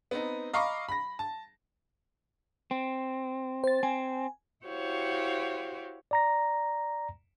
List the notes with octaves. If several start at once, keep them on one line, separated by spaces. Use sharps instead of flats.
B3 C4 D#4
D#5 F5 A#5 B5 C#6 D6
B5 A#6
A5
C4
C5 A6
C4 G#5
E4 F#4 G4 C5 C#5 F5
D5 A#5 A#6